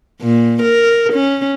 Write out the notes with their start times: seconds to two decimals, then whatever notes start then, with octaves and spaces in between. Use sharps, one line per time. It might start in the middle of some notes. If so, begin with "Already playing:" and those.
0.22 A#2
0.62 A#4
1.13 C#4